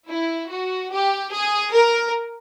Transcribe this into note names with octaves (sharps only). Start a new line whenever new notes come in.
E4
F#4
G4
G#4
A#4